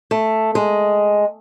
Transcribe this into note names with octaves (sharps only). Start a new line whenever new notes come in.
A3
G#3